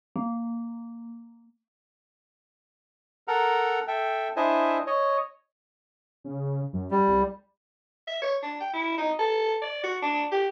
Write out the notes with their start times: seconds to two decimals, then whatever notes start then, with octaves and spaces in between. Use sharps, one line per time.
0.16 A#3
3.28 A4 A#4 F#5 A#5
3.88 A4 E5 G5
4.36 D4 E4 C5 D#5 E5 G#5
4.87 C#5 D#5
6.24 C#3
6.73 F#2
6.91 G3
7.07 C2
8.07 E5
8.22 C#5
8.43 D4
8.60 G5
8.73 E4
8.98 D#4
9.19 A4
9.62 D5
9.84 F#4
10.02 D4
10.32 G4